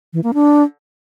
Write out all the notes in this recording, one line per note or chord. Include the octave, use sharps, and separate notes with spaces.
E3
A#3
D4